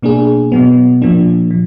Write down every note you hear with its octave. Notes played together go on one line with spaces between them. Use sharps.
B2 A#3 D4 G#4
B2 F#3 B3
A#2 F3 A#3 D4
F3